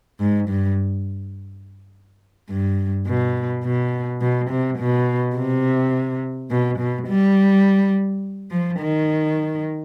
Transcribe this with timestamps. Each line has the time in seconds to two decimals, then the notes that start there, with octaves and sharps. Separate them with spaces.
0.20 G#2
0.49 G2
2.50 G2
3.07 B2
3.64 B2
4.21 B2
4.50 C3
4.78 B2
5.36 C3
6.51 B2
6.78 B2
7.08 G3
8.51 F3
8.79 D#3